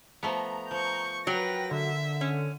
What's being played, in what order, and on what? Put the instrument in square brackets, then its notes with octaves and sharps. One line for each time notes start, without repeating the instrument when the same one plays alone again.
[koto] F3 A3 B3 [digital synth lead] A#5
[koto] F3 [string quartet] C#6 G6
[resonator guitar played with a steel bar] F#3 [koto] A#4 A#5 [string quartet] B4 A#6 [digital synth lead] G5
[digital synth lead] D3 [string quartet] E5
[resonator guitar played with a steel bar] C#4